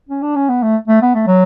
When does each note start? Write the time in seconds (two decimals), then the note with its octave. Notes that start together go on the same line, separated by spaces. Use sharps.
0.09 C#4
0.22 D4
0.36 C#4
0.49 B3
0.63 A3
0.88 A3
1.02 B3
1.15 A3
1.27 F#3